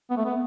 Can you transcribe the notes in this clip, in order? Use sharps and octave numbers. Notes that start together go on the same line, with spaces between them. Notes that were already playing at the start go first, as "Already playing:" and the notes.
B3
A3
B3